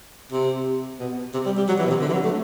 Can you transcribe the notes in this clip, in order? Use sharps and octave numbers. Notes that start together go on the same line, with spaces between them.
C3
B2
C3
G3
G3
F#3
E3
B2
C3
D3
E3
F#3
A3